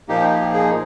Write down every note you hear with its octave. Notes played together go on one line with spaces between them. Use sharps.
A#2 F3 A#3 D#4 G4
G4
G#4